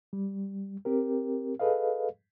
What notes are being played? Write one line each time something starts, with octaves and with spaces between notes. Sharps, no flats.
G3
C4 G4 A#4
G#4 A4 B4 D#5 F5